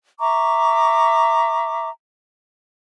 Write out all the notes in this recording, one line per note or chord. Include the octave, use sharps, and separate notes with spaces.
E5 A#5 C#6 D6